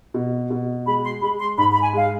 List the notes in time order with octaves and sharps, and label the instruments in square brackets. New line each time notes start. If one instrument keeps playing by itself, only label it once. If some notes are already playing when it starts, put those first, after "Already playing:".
[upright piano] B2
B2
[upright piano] G#3 [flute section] B5
[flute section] C6
[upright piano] G#3 [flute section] B5
[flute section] C6
[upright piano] G#2 [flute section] B5
[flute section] B5
G#5
[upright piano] G#3 [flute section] F5